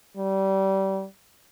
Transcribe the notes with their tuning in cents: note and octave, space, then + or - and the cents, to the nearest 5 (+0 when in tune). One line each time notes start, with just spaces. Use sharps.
G3 -25